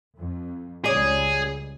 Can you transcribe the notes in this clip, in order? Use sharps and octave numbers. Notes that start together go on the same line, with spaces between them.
F2
C#2 G3 C#4 G#4 D5